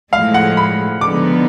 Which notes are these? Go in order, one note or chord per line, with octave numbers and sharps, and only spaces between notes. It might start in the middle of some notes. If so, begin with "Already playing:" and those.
A2 F3 G#3 F5
F#5
B5
D3 F3 G#3 B3 D#4 D6